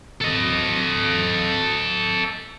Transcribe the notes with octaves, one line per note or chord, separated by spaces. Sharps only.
A4 D#5